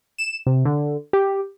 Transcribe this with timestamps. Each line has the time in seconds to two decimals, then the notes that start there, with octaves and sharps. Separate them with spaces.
0.18 E7
0.47 C3
0.65 D3
1.13 G4